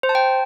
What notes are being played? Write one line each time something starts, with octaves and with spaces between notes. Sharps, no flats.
C5
A5
G5